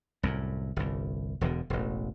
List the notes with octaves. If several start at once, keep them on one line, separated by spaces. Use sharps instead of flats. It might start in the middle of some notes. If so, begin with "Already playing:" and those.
C2 F#2 A2
G1 C2
E1 E2 B2 D3
E1 A1